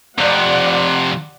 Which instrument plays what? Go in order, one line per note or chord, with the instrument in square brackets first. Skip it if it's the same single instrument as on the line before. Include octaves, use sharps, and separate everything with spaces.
[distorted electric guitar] F2 C3 [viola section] D5 F#5